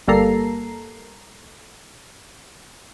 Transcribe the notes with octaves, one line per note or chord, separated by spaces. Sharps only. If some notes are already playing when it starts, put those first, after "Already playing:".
G1 G3 A#3 A4 A#5 C7